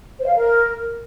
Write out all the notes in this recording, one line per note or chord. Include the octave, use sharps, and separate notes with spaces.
C5
F5
A#4